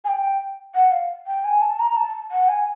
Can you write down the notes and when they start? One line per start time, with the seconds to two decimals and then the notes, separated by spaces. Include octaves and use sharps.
0.04 G#5
0.08 G5
0.75 F#5
0.92 F5
1.27 G5
1.44 G#5
1.62 A5
1.79 A#5
1.97 A5
2.31 F#5
2.49 G#5